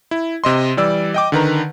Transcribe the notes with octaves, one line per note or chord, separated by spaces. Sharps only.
E4
C3 D#5 C6
E3 G3 D5 E6
D#5 G5 D6
D3 D#3 B4 A#5